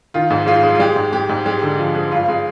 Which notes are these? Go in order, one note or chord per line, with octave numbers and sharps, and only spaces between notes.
D#3 F4
G#2
G#3 F4
G#3
F4
G#3 G4
G#2
G#3 G4
G#2
G#3 G4
D3
F3
G#3
G2 F4
G#3